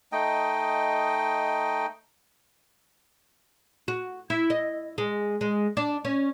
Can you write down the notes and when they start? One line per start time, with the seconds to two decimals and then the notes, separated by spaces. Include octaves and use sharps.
0.12 A3 D#4 D#5 G5
3.88 F#4
4.30 E4
4.50 D#5
4.98 G#3
5.41 G#3
5.77 D4
6.05 C#4